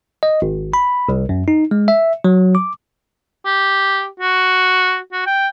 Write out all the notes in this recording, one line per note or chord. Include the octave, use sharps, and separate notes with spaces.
D#5
G#1
B5
C2
F#2
D#4
G#3
E5
F#3
D6
G4
F#4
F#4
G5